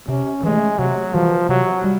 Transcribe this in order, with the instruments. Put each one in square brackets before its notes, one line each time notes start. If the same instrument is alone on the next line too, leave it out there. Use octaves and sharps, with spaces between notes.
[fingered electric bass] C3 [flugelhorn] C#4
[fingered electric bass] E3 A3 [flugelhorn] G#3
[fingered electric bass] C3 [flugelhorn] F#3
[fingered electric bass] E3 G3 [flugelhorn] F3
[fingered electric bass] C3 [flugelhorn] F#3
[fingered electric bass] G3